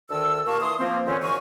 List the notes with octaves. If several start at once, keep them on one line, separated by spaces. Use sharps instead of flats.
D2 D3 D#3 A5 E6
A#2 A#3 G4 F5 A5 C#6
E3 C6 D#6
F3 A#3 C4
F2 A#2 D3 E3 C4 C#4
G#2 F#3 G#4 A#4 G#5 C#6